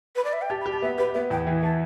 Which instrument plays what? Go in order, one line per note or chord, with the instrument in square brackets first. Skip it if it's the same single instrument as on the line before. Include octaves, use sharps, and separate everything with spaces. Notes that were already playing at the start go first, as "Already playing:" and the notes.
[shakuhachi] B4
D5
E5
G5
[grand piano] G4 [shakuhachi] A5
[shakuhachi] B5
[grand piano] G4
[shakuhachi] A5
[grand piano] B3 [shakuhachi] E5
[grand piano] G4 [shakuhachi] B4
[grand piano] B3 [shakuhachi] E5
[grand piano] E2 [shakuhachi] G5
[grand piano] E3
[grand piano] E3 [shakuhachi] A5